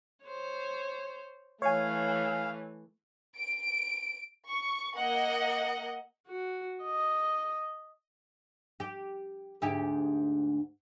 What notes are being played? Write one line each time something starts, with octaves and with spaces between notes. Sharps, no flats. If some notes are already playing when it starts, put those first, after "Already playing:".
C5 C#5
E3 A3 C#5 F5 G#5
D7
C#6
A#3 D#5 F#5
F#4
D#5
G4
D2 G#2 G4